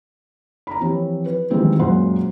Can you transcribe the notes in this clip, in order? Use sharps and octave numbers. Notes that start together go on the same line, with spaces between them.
A#5 B5
E3 F3 C4 G4 C#5
B4
D#3 E3 G3 G#3 C4 F4
F#2 A#2 G#3 C5 F#5 C6